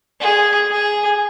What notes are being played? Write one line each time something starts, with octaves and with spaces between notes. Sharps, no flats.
G#4
G#4